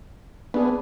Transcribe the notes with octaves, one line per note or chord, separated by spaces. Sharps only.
B3 D4 G#4